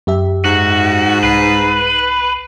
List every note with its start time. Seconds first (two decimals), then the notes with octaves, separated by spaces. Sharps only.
0.07 F#2 G4 E5
0.44 G#2 F#4
1.23 C2 B4 C7